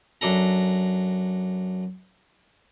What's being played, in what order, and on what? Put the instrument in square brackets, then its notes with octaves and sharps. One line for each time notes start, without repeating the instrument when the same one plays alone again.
[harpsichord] F#2 D4 A4 A#5